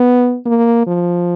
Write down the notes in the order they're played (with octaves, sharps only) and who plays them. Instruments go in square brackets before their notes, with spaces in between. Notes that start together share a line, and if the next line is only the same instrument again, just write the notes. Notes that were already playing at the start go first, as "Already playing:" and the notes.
Already playing: [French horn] B3
A#3
F3